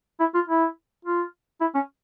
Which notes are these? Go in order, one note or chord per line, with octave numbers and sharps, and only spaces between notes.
E4
F4
E4
F4
E4
C#4